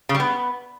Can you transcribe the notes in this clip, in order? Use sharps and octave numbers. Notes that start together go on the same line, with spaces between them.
C#3
G3
B3